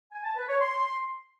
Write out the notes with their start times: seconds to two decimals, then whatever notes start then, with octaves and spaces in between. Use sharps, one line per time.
0.12 G#5
0.24 A5
0.36 B4
0.48 C#5
0.60 C6